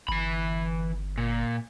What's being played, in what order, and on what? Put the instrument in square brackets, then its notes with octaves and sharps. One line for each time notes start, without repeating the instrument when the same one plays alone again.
[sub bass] G1 [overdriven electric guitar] E3 B5
[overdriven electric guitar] A#2